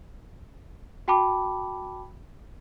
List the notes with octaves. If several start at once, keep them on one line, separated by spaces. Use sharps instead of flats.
F#4 G5 A5 B5 D6